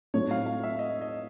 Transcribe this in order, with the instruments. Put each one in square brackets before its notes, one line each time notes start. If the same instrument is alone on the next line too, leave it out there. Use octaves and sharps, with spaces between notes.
[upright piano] A2 F#3 A3 C4 D#4 [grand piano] C#5
[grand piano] F5
F5
E5
D#5
D#5